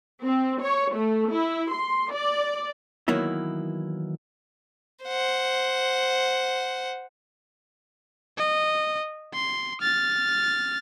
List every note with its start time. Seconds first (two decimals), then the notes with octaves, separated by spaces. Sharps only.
0.22 C4
0.61 C#5
0.94 A3
1.30 E4
1.73 C6
2.12 D5
3.08 D#3 E3 F#3 A#3 B3 E4
5.05 C5 F#5
8.37 D#5
9.34 C6
9.81 F6 A6